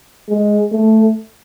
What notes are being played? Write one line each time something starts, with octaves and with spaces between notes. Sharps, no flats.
G#3
A3